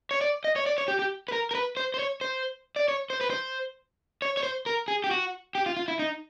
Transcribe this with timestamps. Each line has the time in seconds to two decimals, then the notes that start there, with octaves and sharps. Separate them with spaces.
0.11 C#5
0.21 D5
0.44 D#5
0.56 C#5
0.66 D5
0.78 C#5
0.88 G4
0.99 G4
1.28 B4
1.32 A#4
1.51 A#4
1.55 B4
1.77 C5
1.94 C5
1.99 C#5
2.21 C5
2.76 D5
2.88 C#5
3.10 C5
3.21 B4
3.30 C5
4.22 C#5
4.37 C#5
4.43 C5
4.66 A#4
4.88 G#4
5.04 G4
5.11 F#4
5.55 G4
5.66 F4
5.77 F4
5.88 E4
5.99 D#4